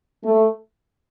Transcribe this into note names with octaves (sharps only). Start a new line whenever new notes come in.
A3